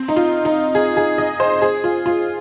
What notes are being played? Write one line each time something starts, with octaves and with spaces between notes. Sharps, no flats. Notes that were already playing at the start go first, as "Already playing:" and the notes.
Already playing: C4
D#4
F4
D#4
G#4
G#4
D#5
C5
G#4
F4
F4